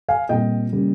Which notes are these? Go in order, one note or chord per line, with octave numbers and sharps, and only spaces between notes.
F5 G#5
A#2 G3 C4 D#5 G5
C#3 G3 A#3 C#4